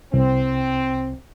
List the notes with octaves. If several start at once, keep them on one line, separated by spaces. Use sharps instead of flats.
C2 C4